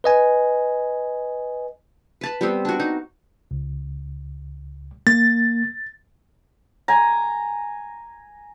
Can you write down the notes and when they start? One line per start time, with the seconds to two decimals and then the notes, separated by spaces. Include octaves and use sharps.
0.04 B4 D#5 G#5
2.21 B4 A5 B5
2.41 G3 B3 C4
2.65 D4 F#4
2.80 D#4
3.51 C#2
5.07 A#3 A6
6.88 G#5 A#5